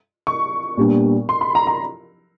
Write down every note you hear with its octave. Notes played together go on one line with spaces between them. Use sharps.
C#6
A#2 G3 B3 D4
C6
B5
A#5
A#5